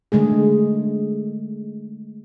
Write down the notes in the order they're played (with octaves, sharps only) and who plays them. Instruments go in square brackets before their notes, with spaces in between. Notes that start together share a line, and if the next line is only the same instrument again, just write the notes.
[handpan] D3 G#3 A3 G#4